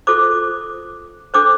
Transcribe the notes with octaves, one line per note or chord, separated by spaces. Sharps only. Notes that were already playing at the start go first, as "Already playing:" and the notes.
F4 A4 C5 D6
D4 A4 C5 D6